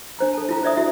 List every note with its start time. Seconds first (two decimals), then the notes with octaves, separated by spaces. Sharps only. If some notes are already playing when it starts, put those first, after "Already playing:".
0.19 D4 C5 A#5
0.33 A4 A5
0.49 E4 F4 A#5
0.63 C5 D5 E5 D#6
0.77 E4 F#4 E5